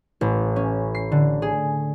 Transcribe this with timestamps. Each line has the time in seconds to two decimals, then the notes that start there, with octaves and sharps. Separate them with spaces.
0.21 A1
0.56 C#4
0.95 C7
1.12 D3
1.42 G#4